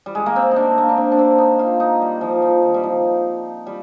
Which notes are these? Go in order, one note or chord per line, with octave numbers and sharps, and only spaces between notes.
G3
G#3
A#3
C4
D4 D#4
A#3
D4
C4
D4
C4
D#4
F4
D#4
G3
F3
F3
D#3
G3
F3
G3